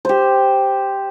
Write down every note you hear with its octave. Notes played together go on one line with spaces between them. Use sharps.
G4 C5